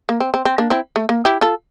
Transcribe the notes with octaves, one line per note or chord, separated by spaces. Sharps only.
A#3
C4
C4
C4
A#3 D4
C4 E4
A3
A#3
E4 G4
F4 A4